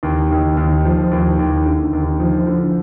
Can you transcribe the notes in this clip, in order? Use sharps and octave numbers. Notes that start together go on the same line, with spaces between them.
D#2
D#2
D#2
F3
D#2
D#2
D3
D#2
F3
D3